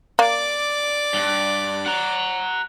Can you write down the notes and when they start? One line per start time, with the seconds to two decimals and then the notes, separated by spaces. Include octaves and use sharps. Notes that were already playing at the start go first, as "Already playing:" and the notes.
0.19 A#3 D5 D6
1.14 G2
1.86 F#5 A#5